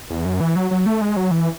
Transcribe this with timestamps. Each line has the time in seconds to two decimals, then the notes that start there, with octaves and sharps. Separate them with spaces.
0.10 E2
0.25 F#2
0.40 E3
0.56 F#3
0.71 F#3
0.86 A3
1.01 G#3
1.17 F#3
1.31 E3